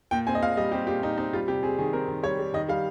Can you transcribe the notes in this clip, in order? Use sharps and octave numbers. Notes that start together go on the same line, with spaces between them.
A#2 G5
C4 G#5
D#5
A#2 F5
G3 D#5
C4 G4
A#2 G4
A#2 D#4
C4 D#4
G3 F4
C3 G4
C4 G#4
D#3 G#4
C4 A#4
D#3
G3 C#5
G3
D#3 D#5
G3 F5